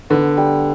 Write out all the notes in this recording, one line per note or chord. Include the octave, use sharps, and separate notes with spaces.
D3 B3
G3